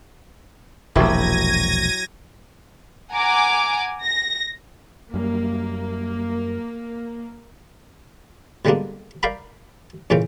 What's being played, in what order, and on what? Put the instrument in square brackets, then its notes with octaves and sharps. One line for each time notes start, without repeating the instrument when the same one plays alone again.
[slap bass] E1 A#1 [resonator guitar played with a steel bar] F#3 E4 G4 [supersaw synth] G#6 A#6 D#7
[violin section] F#5 G#5 A#5 D6
A#6
[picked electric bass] F#2 G3 [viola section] A#3
[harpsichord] B2 D3 G3 G#3 A#3 D4
A#4 D5 F5 G5 A#5 B5
F2 A#2 C#3 E3 C#4 G5